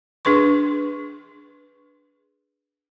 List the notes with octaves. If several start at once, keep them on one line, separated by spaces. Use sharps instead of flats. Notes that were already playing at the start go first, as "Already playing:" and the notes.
D4 G#4 B4 C6 C#6